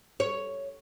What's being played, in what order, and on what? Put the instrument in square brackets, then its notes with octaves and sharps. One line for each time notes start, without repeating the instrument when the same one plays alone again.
[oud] C#5